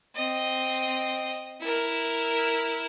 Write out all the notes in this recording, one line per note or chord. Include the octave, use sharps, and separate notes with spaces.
C4 D#5
E4 A#4